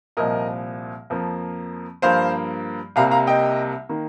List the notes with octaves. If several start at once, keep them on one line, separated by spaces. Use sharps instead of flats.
C2 A#2 F3 A#4 D#5
F2 F3 A#3
G2 F3 A#3 C5 F5
C2 C3 G3 A#3 F5 A#5
F5 A#5
D#5 G5
D#3 A#3